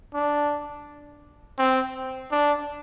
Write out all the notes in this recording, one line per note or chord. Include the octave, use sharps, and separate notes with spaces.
D4
C4
D4